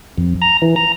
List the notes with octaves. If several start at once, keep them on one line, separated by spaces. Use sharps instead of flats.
F2
A#5
E3
A#5